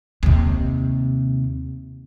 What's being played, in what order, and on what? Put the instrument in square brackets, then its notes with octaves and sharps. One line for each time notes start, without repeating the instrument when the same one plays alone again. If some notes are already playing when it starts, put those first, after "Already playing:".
[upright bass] D#2 C3